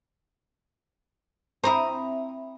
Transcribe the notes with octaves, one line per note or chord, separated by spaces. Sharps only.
C4 E4 A#5 D#6